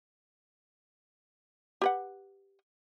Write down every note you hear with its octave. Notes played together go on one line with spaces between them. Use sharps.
G4 B4 F#5